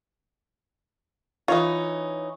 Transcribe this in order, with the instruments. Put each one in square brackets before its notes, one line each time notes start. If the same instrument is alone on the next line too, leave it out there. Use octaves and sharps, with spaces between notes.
[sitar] E3 D#4 C#5 [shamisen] F4 D#5